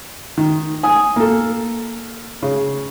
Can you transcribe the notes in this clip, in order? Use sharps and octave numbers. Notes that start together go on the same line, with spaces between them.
D#3
G#5 D#6
A#3 A4
C#3